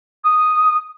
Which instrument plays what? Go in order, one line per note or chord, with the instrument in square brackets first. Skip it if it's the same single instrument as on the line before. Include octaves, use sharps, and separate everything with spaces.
[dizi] D#6